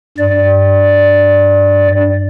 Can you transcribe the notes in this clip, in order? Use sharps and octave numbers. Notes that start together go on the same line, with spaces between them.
G2 D5